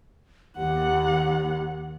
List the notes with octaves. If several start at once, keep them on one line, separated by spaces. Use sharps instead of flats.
D#2 G4 F#5